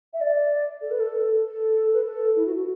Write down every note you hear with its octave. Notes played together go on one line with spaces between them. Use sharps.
E5
D5
A4
B4
A4
A4
B4
A4
E4
F#4
F#4